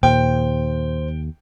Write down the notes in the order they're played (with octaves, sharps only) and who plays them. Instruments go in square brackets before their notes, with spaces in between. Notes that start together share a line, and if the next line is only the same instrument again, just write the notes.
[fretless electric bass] D#2 [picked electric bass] A#2 [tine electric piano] C5 [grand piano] G5